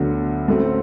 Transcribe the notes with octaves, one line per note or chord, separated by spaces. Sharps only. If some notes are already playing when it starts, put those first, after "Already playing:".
Already playing: D2 D3 F#3 B3
A1 A2 F#3 A3 C4